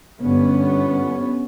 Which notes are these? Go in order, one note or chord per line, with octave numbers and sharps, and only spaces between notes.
G1 B3 C#4